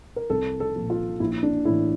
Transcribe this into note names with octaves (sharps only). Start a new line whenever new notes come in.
A#4
C2 A4
A4
A#2 F3
F4
A#1 E4
D4
A2 E3 E4